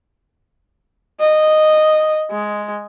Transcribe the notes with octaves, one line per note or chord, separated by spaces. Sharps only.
D#5
G#3